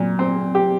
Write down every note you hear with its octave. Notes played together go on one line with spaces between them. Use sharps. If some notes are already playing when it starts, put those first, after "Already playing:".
Already playing: A#2 F#3
C4
G4